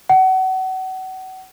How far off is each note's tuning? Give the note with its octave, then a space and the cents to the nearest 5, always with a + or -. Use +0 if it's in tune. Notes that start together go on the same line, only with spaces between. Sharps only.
F#5 +30